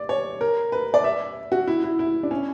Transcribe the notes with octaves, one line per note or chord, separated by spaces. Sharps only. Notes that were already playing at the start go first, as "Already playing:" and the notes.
Already playing: D5
C#5
A#4
B4
D5
E5
F#4
E4
E4
E4
D4
C#4